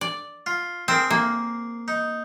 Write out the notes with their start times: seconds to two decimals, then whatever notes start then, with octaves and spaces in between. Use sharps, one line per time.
0.01 D5
0.46 F4
0.88 C4 G#4 A#4 C6
1.10 A#3
1.88 D#4